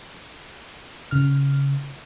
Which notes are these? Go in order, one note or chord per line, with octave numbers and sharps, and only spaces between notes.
C#3 F6